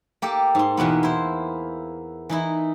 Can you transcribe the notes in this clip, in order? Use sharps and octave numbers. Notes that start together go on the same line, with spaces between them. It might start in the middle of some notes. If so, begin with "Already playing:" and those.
A#3 G4 A4
G#2 C6
E2 B2 A#3 B3
E4 C5
E3 D#4 E4